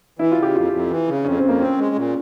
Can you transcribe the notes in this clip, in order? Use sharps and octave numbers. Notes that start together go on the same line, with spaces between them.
E3 E4
F4
C#3
G4
F2 F4
F2
E3
C#3
F2 C#4
C4
F2
A#3
C4 C#4
G#3
A#2